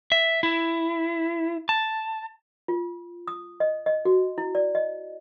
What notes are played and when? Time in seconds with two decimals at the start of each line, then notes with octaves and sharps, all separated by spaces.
0.12 E5
0.43 E4
1.69 A5
2.68 F4
3.27 D#6
3.60 D#5
3.86 D#5
4.05 F#4
4.38 E4
4.55 D5
4.75 D#5